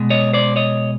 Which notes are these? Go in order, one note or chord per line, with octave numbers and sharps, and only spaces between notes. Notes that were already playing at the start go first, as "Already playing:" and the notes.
Already playing: B2 G#3
C#5 D#5
C5 D5
C#5 D#5